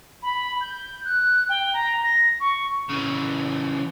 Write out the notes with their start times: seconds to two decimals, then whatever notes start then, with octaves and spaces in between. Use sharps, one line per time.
0.23 B5
0.61 G6
1.05 F#6
1.49 G5
1.74 A#5
2.03 A#6
2.40 C#6
2.90 C#3 E3